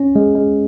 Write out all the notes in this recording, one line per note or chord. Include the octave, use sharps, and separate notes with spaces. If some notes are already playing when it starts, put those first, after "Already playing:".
Already playing: C#4
G#3
G#3